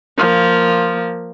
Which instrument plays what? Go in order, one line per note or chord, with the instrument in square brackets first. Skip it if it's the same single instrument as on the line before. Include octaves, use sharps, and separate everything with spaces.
[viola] F3 A#3